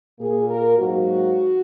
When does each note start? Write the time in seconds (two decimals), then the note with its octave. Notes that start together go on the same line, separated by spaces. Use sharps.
0.19 A#2 A#3 G#4
0.48 A#4
0.77 G#2 F#3 A#3 F#4